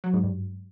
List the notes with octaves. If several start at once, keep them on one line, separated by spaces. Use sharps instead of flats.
F#3
G#2
G2